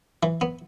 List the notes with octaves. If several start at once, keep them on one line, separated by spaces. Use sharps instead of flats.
E3
B3